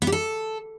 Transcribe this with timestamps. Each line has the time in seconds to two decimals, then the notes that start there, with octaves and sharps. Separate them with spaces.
0.02 B3
0.07 G4
0.12 A4